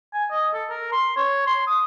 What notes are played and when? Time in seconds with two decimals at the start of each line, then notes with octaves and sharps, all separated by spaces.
0.14 G#5
0.31 D#5
0.54 A4
0.70 A#4
0.92 C6
1.17 C#5
1.47 C6
1.67 D#6